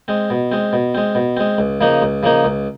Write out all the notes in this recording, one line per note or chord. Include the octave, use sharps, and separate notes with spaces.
G#3 C4
B2
G#3 C4
B2
G#3 C4
B2
G#3 C4
C#2
C#3 F3 A#3 D#4
C#2
C#3 F3 A#3 D#4
C#2